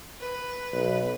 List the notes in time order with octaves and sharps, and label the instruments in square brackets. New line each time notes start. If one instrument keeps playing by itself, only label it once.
[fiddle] B4
[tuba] B1